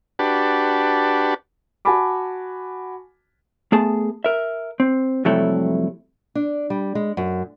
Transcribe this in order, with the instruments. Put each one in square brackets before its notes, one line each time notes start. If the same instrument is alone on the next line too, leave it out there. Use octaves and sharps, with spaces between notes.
[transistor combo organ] D4 F#4 G4 B4 A5
[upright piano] F#4 G#5 A5 B5 D6
[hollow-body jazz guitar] A3 B3 G#4 A5
A#4 E5
C4
F2 C3 F#3 G3 A3 E4
[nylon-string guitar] D4
G3
G#3
F#2